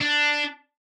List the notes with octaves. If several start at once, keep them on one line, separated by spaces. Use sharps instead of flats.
D4